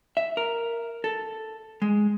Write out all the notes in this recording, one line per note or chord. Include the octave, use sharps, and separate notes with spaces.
E5
A#4
A4
G#3